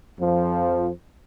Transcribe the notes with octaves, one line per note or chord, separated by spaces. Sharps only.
F2 F3